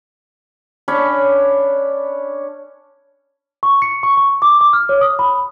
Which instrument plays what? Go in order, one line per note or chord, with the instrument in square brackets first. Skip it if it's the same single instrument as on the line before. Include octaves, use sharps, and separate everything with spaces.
[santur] C#4 D4 C#5 B5
[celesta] C#6
C#7
C#6
C#6
D6
D6
F6
C#5
D#6
B5